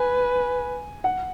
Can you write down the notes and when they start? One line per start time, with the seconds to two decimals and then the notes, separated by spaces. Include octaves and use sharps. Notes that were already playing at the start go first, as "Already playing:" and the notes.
Already playing: B4 G#5
1.04 F#5